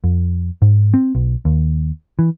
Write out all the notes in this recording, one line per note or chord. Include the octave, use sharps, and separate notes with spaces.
F2
G#2
C4
B1
D#2
E3